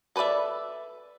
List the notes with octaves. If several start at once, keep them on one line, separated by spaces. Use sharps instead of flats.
A4 B4 C5 D5 E5